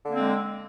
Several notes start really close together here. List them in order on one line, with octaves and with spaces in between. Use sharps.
D3 A#3 C4 G#3